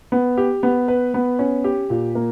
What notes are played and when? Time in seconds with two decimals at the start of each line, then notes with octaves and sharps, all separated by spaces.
0.12 B3
0.37 G4
0.63 B3
0.88 B4
1.14 B3
1.39 C#4
1.64 G4
1.90 A#2
2.15 A#3